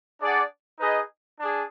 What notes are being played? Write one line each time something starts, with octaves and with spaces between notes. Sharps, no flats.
D4 G#4 D5 F#5
D#4 G#4 B4 D#5
D4 G#4